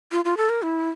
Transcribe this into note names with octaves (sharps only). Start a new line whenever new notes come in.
F4
F4
A4
A#4
E4